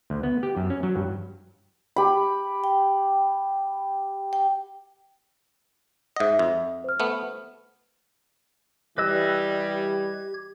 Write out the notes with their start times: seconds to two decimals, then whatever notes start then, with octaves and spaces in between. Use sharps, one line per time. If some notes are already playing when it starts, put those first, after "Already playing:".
0.10 D2
0.23 B3
0.43 G4
0.57 F#2
0.70 C#4
0.83 F#3
0.96 G2
1.96 G4 B5
2.64 G5
4.33 G5
6.16 G#2 D#5 E5 F#5
6.39 F2
6.84 C5 F6
7.00 A3 B3
8.98 E3 G3 G4 B4 D#5 E6 G#6